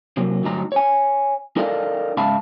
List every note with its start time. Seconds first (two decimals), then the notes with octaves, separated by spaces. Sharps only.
0.17 C3 F#3 A#3
0.43 D2 G2 F#3 D#4 A#5
0.72 C#5 G#5
1.56 D#4 A4 A#4 D5 D#5 F5
2.17 G#2 C#3 E5 F5 A5 B5